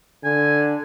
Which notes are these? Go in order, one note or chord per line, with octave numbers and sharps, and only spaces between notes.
D3 G#5